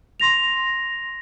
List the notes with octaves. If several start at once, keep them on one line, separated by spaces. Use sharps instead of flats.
C6 A#6 F7